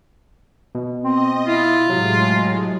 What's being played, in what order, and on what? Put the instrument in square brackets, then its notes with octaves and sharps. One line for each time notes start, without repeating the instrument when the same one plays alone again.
[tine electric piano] B2
[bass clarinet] C4 [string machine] D#5
[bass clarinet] E4 [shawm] F4
[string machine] A2 G#3 [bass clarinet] C3 [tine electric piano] F#3